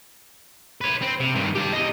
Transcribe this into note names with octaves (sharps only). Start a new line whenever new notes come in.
B4 C#5
C4
C3
G2 D#3
G4 A5
E2 D#5